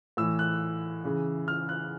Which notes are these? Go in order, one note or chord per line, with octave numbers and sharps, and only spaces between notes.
A2 E3 E6
F#6
C#3 E3
F6
F#6